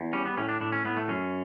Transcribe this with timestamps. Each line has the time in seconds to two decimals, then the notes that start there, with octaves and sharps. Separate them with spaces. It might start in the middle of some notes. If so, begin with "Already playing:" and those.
Already playing: E2
0.13 G3 C#4
0.25 B3
0.37 A2 C#4
0.49 D4
0.61 A2 D4
0.72 C#4
0.85 A2 B3
0.97 A3
1.08 F#2 C#4